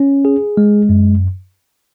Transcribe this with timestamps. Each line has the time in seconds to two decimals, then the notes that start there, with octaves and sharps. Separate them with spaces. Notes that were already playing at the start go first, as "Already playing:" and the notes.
Already playing: C#4
0.25 G#4
0.57 G#3
0.89 F#2